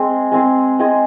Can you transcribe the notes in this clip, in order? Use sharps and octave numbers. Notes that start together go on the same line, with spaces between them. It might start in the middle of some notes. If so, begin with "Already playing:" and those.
Already playing: G#3 C4 G#4
G#3 C4 G#4
G#3 C4 G#4